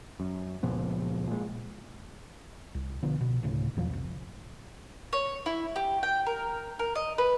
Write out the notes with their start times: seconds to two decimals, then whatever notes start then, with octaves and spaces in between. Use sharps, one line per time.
0.20 F#2
0.63 C#2 A#2 F3 B3
1.27 A#2 G#3
2.75 C2
3.03 B2 D3 F3 B3
3.21 B2
3.43 D1 D2 A2 C#3
3.77 E2 B2 F3 F#3
3.89 F1 C2
5.13 C#5
5.46 E4
5.76 G4
6.03 G5
6.26 A#4
6.79 A#4
6.95 D#5
7.18 B4